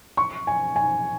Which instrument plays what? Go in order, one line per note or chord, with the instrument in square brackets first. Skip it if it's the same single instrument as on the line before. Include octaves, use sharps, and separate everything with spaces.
[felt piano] C#6
G#5
G#5